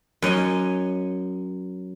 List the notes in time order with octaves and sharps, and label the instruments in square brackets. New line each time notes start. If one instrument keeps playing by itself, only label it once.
[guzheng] F#2 C#5 D#5 G#5